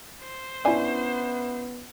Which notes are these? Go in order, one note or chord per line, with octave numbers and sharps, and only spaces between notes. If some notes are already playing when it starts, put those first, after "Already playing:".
C5
B3 C#4 D4 E4 G#5